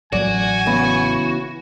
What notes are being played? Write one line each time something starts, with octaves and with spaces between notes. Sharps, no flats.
A1 F#3 F#4 D5 G#5
C#3 E3 B3